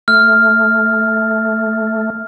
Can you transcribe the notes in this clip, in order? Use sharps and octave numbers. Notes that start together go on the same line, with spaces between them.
A3 F6